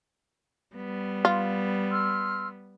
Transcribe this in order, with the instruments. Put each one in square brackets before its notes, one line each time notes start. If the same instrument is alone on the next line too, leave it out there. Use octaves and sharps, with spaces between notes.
[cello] G3 B3
[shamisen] F4
[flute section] C6 E6 F6